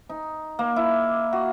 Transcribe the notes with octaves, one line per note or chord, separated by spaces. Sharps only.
D#4
A#3
E4
F#4